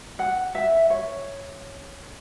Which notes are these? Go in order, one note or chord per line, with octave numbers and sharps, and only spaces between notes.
F#5
E5
C#5